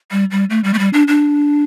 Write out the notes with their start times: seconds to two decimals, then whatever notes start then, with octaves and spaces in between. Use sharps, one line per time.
0.11 G3
0.31 G3
0.50 A3
0.64 G3
0.74 A3
0.79 G3
0.93 D4
1.08 D4